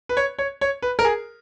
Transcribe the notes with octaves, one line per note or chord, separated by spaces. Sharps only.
B4
C#5
C#5
C#5
B4
A#4
G#4